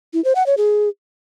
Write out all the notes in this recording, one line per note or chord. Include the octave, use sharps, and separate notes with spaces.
E4
C5
F#5
C#5
G#4